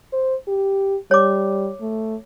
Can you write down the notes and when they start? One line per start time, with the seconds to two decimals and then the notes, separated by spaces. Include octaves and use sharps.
0.13 C5
0.48 G4
1.11 G3 C#5 D6
1.81 A3